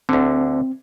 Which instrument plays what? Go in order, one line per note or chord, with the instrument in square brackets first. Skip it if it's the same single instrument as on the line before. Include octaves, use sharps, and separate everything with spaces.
[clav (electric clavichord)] D2 D3 [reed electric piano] C4